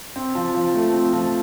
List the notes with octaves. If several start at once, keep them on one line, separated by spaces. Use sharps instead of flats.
C4
F3
F3
A3
C4
F3